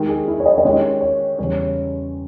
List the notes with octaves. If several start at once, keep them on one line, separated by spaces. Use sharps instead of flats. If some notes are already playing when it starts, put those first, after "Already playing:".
Already playing: D#3 G#3 D#4 G4
G#4
E4
C#5
D#5
D#5
D#3 G#3 C#4 G4 C#5
C#5
E2 C#3 G3 C#4 C#5